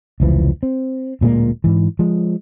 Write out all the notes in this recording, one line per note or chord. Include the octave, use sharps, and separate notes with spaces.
F1 C#2 E3 F3
C4
D1 A#2 G#3 A#3
G#2 E3
F3 G#3